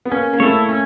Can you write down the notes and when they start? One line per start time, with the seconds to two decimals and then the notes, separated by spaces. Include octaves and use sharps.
0.05 B3
0.11 A#3 C#4
0.33 A#3
0.40 A3 E4 A4 C#5
0.69 C#4